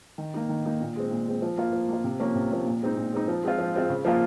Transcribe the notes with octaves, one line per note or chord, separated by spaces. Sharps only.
D#3
A#3 D#4
D#3
A#3 D#4
A#2
G#3 C4
A#2
G#3 C4
F3
A#3 F4
F3
A#3 F4
C3
F3 A#3 C#4
C3
F3 A#3 C#4
A#2
G#3 C4 D#4
A#2
G#3 C4 D#4
F3
G#3 C4 F4
F3
G#3 C4 F4
C#3
F3 A#3 F4